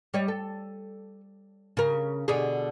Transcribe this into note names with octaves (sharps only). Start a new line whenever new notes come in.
G3 C#5 D#5
A4
C#3 A#4
B2 D3 G#4